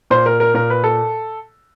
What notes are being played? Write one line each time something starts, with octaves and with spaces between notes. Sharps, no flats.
A#2 C5
A#4
A#4
A#2 A#4
B4
A4